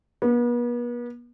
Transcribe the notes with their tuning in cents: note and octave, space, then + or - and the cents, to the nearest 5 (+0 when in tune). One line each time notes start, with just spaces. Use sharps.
B3 -40